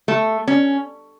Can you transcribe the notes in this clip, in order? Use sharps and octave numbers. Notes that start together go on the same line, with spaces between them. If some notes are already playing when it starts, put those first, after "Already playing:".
A3
C#4